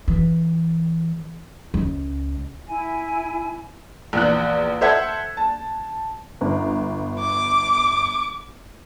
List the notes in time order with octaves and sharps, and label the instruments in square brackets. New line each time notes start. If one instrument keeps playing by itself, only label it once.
[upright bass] E3
C#2
[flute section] E4 G#5
[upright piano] A#1 E2 F#6
A4 C5 E5 F#5 G#6
A5
[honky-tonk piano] G1
[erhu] D6